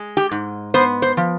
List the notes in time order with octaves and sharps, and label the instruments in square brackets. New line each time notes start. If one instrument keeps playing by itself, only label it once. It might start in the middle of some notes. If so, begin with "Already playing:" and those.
Already playing: [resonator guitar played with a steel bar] G#3
G4
G#2
B3 C5
C5
F3